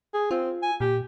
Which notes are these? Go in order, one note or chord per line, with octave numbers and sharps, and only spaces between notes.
G#4
C4 F4
G#5
A#2 G4